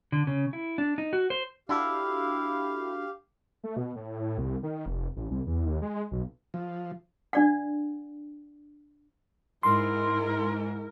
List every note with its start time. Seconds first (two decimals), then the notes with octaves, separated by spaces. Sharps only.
0.12 D3
0.27 C#3
0.53 E4
0.78 D4
0.98 D#4
1.13 F#4
1.30 C5
1.69 D4 E4 F#4 G4 A4 F5
3.64 A3
3.76 B2
3.96 A2
4.38 C2
4.63 D#3
4.86 F1
5.16 A1
5.31 C2
5.46 E2
5.66 D#2
5.82 G#3
6.12 B1
6.54 F3
7.33 D4 D5 F#5
9.63 G#2 E4 A#4 C6